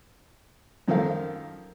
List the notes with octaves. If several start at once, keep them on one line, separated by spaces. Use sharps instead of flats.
F#2 D#3 F3 A4 A#4 F5